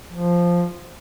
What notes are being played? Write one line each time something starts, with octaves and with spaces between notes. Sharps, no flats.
F3